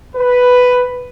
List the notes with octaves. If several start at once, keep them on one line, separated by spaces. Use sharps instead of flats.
B4